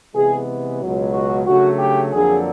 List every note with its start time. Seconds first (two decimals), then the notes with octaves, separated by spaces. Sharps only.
0.14 C3 E3 G#3 B3 G#4
0.81 C#2 B2 F#3
1.14 F#4
1.46 C#3 F#3 A3 D4 F#4
1.79 G4
2.12 F2 D3 F#3 A#3 D4 G#4